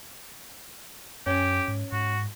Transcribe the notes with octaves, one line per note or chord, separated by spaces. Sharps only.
F#2 C#4 G4
G#2
G#2 F#4